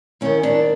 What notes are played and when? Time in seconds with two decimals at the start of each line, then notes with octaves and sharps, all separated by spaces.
0.21 D#2 D#3 C#4
0.43 D4